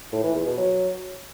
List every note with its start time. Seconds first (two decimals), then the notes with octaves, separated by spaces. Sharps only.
0.12 A2
0.24 E3
0.35 E2
0.46 B2
0.58 F#3